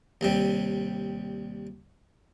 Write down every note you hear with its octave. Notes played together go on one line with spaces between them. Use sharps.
D#2 C3 G3